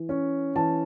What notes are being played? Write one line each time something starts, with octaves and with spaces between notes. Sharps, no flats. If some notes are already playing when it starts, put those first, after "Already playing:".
Already playing: E3
C#4
E3 A5